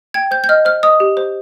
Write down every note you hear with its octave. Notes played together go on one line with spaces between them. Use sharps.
G5 G#6
C5 G6
G6
D#5 F6
C5 F6
D#5 D#6
G4
C5